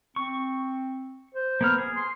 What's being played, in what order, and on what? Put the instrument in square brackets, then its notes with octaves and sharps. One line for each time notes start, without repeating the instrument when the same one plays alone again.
[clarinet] C4 [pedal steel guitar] C#6
[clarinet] C5
[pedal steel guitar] A#3 B3 F6
G#4
[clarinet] C6